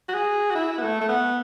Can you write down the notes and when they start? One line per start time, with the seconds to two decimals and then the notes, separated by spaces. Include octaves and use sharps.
0.08 F#4
0.14 G#4
0.51 F#4
0.55 E4
0.78 B3
0.82 A3
1.01 A3
1.08 B3